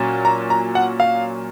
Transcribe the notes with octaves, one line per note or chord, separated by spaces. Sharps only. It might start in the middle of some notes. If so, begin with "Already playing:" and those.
Already playing: A#2 F#3 C#4
A#5
A#5
F#5
F5